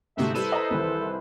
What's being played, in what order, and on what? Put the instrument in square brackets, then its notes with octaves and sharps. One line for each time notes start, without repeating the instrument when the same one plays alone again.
[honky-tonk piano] G#2 C3 A3 [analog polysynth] C4 D#4 F#4 [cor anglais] E5
[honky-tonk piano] G3 D#7 E7 [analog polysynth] E4 B4 C5 [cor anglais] A4
[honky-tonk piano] D#5 A#5
C2 D#3 E3